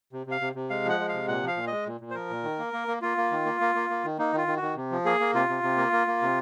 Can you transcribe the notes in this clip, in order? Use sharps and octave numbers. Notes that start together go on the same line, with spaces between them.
C3
C3 F5
C3
C3
G#3 F5
F3 F#5
G#3
F5
C3
A#2 F#5
F3 F5
A#2
G#3 D#5
A#2
A#2
C5
F3 A#4
A#2
D#3
A#3
A#3
A#3
A#3 F4
A#3
D#3
A#3
A#3
A#3
A#3
D#3
A#3 D#4
D#3 F4
D#3
F#4
D#3
C3
F3
A#3 G#4
A#3
C3 F4
C3
C3
A#3
A#3
A#3
C3